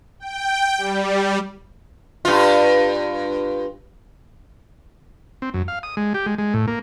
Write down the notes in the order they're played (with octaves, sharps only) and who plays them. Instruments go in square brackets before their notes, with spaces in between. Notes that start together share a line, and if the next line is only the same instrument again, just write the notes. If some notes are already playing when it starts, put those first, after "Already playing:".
[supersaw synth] G5
G3
[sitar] G2 F4
[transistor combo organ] C4
F#2
F5
D#6
G#3
G4
G#3
G#3
A2
A#3